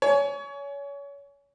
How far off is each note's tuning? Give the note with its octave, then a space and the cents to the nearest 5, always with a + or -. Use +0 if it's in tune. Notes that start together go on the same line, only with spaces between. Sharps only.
C#5 +30 G#5 +20